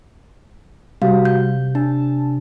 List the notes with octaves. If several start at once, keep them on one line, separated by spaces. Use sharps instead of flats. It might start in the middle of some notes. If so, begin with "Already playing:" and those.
C3 G3 F#4 F5
G6
D4 A5